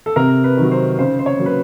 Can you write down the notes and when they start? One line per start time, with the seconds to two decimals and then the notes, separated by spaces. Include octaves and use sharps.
0.06 A4
0.16 C3 A#4
0.44 B4
0.57 D#3 F#3
0.71 C5
0.98 C#3 C5
1.19 C5
1.26 C#5
1.39 F#3 A#3
1.46 B4